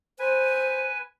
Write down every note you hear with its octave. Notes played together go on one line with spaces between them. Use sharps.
B4 C5 G#5